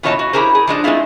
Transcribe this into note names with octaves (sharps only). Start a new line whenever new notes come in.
B2 E3 F4 C#5 D#5 A5
F#4
E4 G4 G#4 A#4 C5
G#4
F3 G#3 D4 C5
G#3 A3 C4 E4 F4